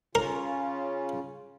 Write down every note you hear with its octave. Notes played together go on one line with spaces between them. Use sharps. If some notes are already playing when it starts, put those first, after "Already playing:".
C#3 C#4 F4 A#4